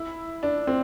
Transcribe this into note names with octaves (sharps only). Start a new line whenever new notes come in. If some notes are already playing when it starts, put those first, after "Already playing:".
Already playing: E4
D4
C4